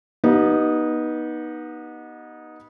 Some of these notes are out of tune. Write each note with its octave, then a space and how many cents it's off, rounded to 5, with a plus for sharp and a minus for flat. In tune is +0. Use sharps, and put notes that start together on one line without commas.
B3 -25 D#4 +0 G4 -30